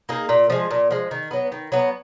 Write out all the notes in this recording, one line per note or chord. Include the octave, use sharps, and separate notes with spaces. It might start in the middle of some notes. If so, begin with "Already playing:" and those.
A#3 D#4 G#4
A#2
F3 G#3
A#2
F3 G#3
D#3
F#3 B3
D#3
F#3 B3